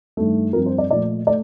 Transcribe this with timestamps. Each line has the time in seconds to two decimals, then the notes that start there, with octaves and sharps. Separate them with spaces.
0.17 G2 D#3 A3
0.53 G2 F3 C4 F4 A#4
0.66 C5
0.78 D5
0.91 A#2 F3 A3 D5
1.27 A3 D5